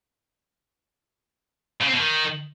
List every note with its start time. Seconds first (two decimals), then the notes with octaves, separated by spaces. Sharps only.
1.82 C#3
1.88 C4
1.93 B2
1.99 D#3